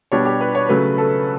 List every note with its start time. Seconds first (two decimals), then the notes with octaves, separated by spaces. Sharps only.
0.12 B2 G3 D4 C#5
0.25 G4
0.41 B4
0.55 C#5
0.69 C#3 F#3 A3 B4
0.98 A4